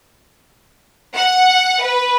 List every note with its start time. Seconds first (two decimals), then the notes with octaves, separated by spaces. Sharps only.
1.15 F#5
1.83 B4